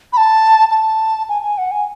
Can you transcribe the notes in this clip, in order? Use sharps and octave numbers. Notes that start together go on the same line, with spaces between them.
B5
A5
A5
G#5
G#5
F#5
G#5